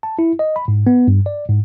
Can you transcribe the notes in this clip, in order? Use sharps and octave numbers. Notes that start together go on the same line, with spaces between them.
A5
E4
D#5
B5
G#2
B3
G2
D5
G#2